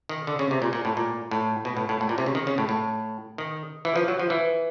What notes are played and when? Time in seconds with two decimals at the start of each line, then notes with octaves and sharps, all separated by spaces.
0.09 D#3
0.27 D3
0.39 C#3
0.51 C3
0.62 A#2
0.73 A#2
0.85 A2
0.97 A#2
1.31 A2
1.65 B2
1.77 A2
1.89 A2
2.01 A2
2.09 A#2
2.18 C3
2.26 C#3
2.35 D#3
2.47 C#3
2.58 A2
2.69 A2
3.38 D#3
3.85 E3
3.96 F3
4.08 F#3
4.19 F3
4.30 E3